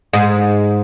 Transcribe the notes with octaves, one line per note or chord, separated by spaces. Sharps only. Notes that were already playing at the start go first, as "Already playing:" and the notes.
G#2